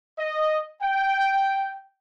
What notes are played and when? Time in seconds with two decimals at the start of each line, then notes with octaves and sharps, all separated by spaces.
0.19 D#5
0.82 G5